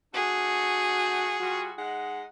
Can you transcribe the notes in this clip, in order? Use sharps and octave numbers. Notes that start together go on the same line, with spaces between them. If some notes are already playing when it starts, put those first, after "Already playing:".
A3 D4 F#4 G#4
G3 F4 F#4
G#3 D#4 F#5